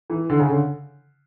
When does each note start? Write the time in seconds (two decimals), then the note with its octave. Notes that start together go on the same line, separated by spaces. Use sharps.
0.10 E3
0.30 D3
0.40 C#3
0.49 D3